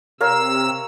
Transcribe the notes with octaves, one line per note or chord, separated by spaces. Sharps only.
C3 A#4 C#5 F5 E6